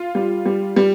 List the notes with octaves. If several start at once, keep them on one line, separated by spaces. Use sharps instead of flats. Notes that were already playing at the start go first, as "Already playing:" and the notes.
Already playing: F4
G3
G3
G3